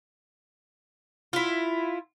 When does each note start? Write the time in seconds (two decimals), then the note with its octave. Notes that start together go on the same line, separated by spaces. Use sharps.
1.33 E4 F4